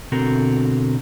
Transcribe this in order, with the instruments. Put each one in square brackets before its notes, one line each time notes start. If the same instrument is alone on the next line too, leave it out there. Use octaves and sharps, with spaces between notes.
[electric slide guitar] B2 D3 C4 F#4 A4 A#4